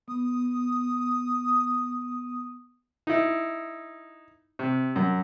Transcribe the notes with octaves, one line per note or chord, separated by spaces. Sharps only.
B3 D#6
D#4 E4
C3
F#2